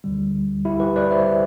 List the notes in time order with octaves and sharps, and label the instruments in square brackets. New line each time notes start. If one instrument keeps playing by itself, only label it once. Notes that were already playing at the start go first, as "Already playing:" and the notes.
[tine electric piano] D2 D3 G3
E4 G4
G4 B4
B4 D5
C5 E5